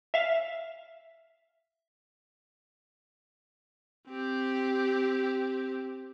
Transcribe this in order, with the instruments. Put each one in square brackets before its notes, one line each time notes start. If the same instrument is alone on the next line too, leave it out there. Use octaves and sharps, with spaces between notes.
[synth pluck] E5 F5
[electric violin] C4 G4